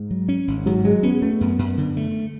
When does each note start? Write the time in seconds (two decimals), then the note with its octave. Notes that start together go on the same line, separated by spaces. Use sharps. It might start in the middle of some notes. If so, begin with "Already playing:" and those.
Already playing: G#2
0.11 F#3
0.29 C#4
0.48 G#1
0.66 G#2 F#3
0.84 F#3 G#3
1.03 B3 C#4
1.22 A3 B3
1.41 F#2
1.59 F#2
1.78 D3
1.97 A3